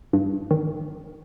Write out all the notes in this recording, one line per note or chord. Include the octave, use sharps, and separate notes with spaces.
G2
D#3